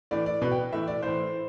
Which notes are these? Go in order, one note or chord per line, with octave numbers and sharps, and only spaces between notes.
A2 E3 D5
D5
B2 B4
G5
A2 E3 E5
D5
A2 E3 C5